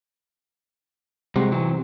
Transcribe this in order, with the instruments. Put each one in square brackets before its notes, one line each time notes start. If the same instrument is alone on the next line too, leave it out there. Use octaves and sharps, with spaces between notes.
[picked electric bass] C3 [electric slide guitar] G3 G#3 F#4
[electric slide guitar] E3 F#3 C4